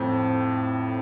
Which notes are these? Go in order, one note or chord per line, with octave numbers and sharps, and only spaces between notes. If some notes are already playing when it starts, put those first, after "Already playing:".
Already playing: F2 A2 C4